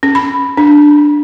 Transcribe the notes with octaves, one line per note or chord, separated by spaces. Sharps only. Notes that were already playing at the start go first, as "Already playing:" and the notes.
C#4
B5
D4